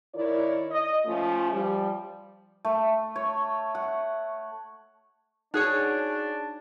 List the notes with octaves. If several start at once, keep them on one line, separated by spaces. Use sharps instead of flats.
D#3 E4 A#4 C#5 D5
D#5
F3 A3 C#4 F4
F3 G3
A3
C#5
F#5
D4 D#4 F#4 G#4 C#5 F#6